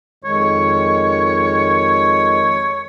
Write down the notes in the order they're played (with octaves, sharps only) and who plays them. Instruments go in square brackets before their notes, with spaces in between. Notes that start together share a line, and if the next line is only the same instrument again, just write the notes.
[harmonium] F2 D#3 G#3 [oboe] C#5